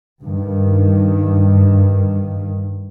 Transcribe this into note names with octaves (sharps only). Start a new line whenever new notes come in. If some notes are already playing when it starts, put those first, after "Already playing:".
G2 D#3